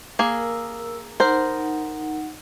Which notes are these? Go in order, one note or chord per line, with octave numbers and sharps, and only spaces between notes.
A#3 G#4 A#4 E6
D#4 A#4 C5 F#5